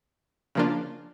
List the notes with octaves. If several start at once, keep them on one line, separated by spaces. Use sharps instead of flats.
C#3 F3 A#3 D4 F4